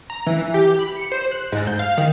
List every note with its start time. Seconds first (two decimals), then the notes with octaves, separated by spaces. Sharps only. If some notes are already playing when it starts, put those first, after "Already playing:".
0.10 A#5
0.26 E3
0.54 G4
0.79 B5
0.96 C#7
1.12 C5
1.31 F#6
1.52 G#2
1.67 G6
1.79 F5
1.98 D#3